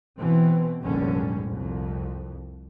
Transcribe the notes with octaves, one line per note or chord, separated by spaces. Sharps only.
B2 E3 C4
F1 A#1 G#2 D3 G3 C#4
C2 F2